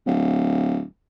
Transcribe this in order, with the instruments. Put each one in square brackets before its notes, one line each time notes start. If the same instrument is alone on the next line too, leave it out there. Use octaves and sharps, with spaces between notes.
[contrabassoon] D1